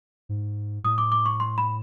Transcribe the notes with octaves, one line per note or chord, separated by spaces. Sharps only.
G#2
A2 D#6
D6
D6
C#6
C6
B5